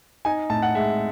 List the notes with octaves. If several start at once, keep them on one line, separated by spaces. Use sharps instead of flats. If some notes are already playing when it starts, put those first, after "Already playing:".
D#4 G#5
A2 A5
F#5
G#3 E5